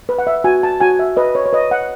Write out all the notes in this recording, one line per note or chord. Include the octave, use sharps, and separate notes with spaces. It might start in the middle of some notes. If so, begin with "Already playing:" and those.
B4
F#5
E5
F#4 G#5
A5
F#4 G#5
E5
B4 D#5
C#5
C#5
B4 D#5
F#5